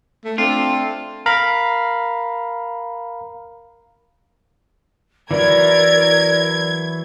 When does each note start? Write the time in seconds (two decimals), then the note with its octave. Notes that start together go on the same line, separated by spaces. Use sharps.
0.25 A3
0.38 A3 C4 D4 F4
1.26 A#4 F5 A#5 B5
5.31 E3 F#3 E4 A#4 D5 G#6